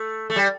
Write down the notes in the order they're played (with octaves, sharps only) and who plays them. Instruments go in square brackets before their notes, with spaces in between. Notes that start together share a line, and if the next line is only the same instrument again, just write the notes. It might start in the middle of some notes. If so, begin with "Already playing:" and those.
Already playing: [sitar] A3
A3
G3